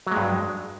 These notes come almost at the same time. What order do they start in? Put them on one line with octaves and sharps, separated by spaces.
F#3 G#3 G2